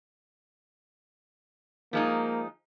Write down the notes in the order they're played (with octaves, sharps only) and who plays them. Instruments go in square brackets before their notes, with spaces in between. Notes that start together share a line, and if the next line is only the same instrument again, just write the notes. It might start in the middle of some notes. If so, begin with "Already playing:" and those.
[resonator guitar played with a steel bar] F3 G#3 D#4 [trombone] A#3